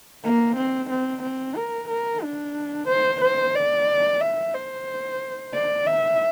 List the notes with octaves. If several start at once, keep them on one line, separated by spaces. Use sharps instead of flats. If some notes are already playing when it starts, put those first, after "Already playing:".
A#3
C4
C4
C4
A#4
A#4
D4
C5
C5
D5
E5
C5
D5
E5